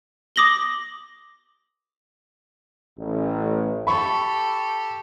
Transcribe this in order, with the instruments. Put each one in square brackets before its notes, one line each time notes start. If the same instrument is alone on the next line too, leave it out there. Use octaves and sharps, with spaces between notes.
[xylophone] D6 D#6 A#6 F#7 G7
[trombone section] A1
[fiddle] G4 A4 [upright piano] B5 C#6